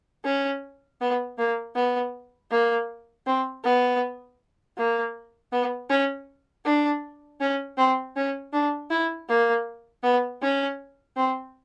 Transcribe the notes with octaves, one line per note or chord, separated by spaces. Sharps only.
C#4
B3
A#3
B3
A#3
C4
B3
A#3
B3
C#4
D4
C#4
C4
C#4
D4
E4
A#3
B3
C#4
C4